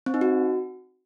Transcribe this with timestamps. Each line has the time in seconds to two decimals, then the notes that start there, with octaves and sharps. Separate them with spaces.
0.06 C4
0.14 D#4
0.21 F#4